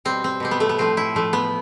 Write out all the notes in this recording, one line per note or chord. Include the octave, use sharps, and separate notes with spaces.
B2 G3 C4
C4
B2 G3 C4
B3
A3
B3
A2 F3 A3 C4
E4
A2 F3 A3
B3